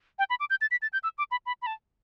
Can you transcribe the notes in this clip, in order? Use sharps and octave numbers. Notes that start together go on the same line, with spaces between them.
G5
B5
D6
G6
A6
B6
A6
G6
E6
D6
B5
B5
B5
A5